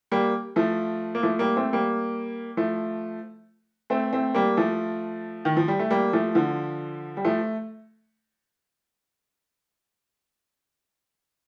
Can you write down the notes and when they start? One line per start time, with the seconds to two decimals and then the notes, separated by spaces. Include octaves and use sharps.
0.12 G3 A#3
0.56 F3 A3
1.15 A#3
1.23 F3 A3
1.39 G3 A#3
1.57 A3 C4
1.73 G3 A#3
2.57 F3 A3
3.90 A3 C4
4.13 A3 C4
4.34 G3 A#3
4.57 F3 A3
5.45 D#3
5.57 F3
5.68 G3
5.79 A3
5.91 G3 A#3
6.13 F3 A3
6.35 D3 F3
7.17 G3
7.25 F3 A3